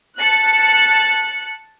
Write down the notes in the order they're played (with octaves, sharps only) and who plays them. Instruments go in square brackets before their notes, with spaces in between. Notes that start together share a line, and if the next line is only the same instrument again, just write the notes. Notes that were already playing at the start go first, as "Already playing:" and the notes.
[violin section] A5 F#6 C#7